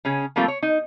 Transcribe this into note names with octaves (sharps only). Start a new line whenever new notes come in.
C#3 C#4 G#4
F3 G3 A3 A#3 C4 F4
C#5
D#4